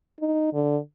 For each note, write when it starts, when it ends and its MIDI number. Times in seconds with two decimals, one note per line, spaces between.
0.20 0.53 63
0.54 0.78 50